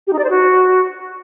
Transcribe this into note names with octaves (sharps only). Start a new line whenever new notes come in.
G4
D#4
D5
C5
F#4